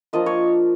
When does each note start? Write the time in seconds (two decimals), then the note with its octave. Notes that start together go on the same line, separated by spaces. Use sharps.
0.13 F3 A#3 D4 F4 D#5
0.26 C#5